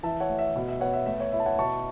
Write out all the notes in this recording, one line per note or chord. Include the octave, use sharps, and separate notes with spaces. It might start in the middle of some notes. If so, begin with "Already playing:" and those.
E3 E5 A5
C#5 F#5
A3
E5
B2
E5
B3 C#5 F#5
E5
A3 E5
C#5
E4 E5
A5
C#5 F#5
B2 A5 C#6